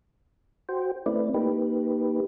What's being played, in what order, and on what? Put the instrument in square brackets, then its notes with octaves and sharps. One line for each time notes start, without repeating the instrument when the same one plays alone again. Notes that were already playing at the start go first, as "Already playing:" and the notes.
[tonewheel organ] F#4 C5 G5
A3 C4 E4 B4 D5
A#3 D#4 G4 B4